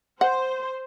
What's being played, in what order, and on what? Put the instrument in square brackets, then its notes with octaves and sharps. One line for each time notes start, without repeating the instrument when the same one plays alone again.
[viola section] C5 [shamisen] F#5